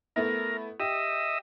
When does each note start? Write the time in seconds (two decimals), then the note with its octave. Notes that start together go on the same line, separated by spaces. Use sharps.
0.16 A3 B3 E4 A#4
0.80 G4 D#5 E5